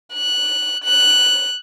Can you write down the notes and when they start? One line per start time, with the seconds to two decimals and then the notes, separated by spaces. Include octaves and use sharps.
0.14 F#6
0.84 F#6